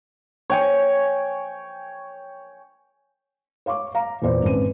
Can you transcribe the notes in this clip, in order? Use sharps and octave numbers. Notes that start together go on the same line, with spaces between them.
C#5 G5 G#5
C#5 F5 C#6 D6
F5 A#5
E2 A#2 C5 D5
G#1 G#3 C4 C#4 B4 D#7